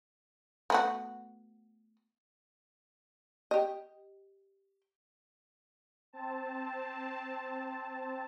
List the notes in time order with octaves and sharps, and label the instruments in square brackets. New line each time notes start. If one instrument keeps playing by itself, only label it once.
[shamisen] A3 B3 F#4
G4 D#5
[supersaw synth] C4 A5